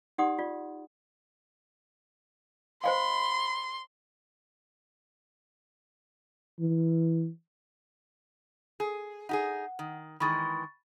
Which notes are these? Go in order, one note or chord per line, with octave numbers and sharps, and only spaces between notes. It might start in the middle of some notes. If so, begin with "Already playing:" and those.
D#4 G4 D5 F#5 C6 D#6
F4 D5
C5 D#5 F5 B5 C6
E3
G#4
D#4 G4 G#4 F#5
D#3
D#3 E3 G#3 B5 C#6 A6